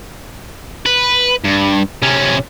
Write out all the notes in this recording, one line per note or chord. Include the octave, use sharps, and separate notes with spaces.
B4
G2
C3 C#4